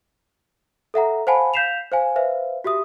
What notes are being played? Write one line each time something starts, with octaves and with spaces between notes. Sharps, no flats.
A4 E5 F#5 A#5
C5 F5 F#5 G#5 A5 B5
F5 G6 B6 C7 E7 F7
C5 F5 G#5
B4 C5 E5 F5
F#4 G4 E5 D#6